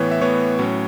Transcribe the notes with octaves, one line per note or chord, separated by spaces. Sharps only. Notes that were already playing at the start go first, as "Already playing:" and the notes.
Already playing: A2 E3 B3 C#5
E5
A2 E3 B3 C#5
A2 F#3 C#4